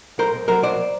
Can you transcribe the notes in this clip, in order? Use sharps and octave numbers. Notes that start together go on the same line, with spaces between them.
B1 A#4 C5
B1
F#3 A#4 C5
B1 C5 D5